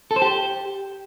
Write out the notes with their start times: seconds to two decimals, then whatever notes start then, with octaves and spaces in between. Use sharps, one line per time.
0.11 A4
0.16 C5
0.22 G4